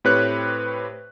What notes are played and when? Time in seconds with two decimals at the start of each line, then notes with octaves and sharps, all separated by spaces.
0.04 A2 C4 G4 B4 C#5 F#6